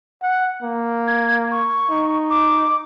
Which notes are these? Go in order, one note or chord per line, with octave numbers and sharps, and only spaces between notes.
F#5
A#3
G#6
C#6
D#4
D6